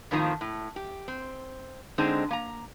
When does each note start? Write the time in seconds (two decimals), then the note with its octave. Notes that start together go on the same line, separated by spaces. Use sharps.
0.11 F2 A2 D#3 F3 A#3
0.41 A2
0.76 G4
1.08 C4
1.98 D3 G#3 C4 D4 D#4
2.31 A#3 A#5